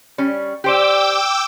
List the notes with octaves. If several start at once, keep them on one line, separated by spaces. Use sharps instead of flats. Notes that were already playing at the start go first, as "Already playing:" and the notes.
G3 C#4
G4 C5 D5 G5 D6 E6